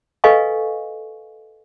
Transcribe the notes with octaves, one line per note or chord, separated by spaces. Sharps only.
A4 B4 D#5 F5 G#5 C#6